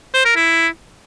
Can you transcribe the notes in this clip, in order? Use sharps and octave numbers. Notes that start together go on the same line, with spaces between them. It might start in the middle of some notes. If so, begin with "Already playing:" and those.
C5
A#4
E4